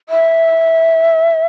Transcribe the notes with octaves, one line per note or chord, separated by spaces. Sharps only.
E5